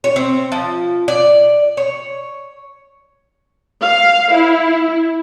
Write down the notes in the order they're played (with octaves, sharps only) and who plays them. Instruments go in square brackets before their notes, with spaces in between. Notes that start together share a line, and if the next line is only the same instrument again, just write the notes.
[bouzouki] C#5
C4
F3
D5
C#5
[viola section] F5
E4